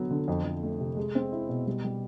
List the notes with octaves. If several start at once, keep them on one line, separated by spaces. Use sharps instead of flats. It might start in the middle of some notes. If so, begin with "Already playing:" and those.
Already playing: D3 F#3 B3
D3
F2
F2
A3
C3
G#3
C4
E4
B2
G3
G3